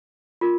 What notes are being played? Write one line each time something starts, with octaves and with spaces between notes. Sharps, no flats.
F4 A#4